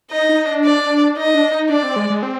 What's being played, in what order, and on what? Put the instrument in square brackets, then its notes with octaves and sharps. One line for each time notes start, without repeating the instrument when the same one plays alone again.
[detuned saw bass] D#4 [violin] D#5
[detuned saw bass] D#4
D4
[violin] D5
[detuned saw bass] D#4 [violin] D#5
[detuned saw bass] D4
D#4
[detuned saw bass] D4 [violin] D5
[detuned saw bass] C4
G#3
G#3
C4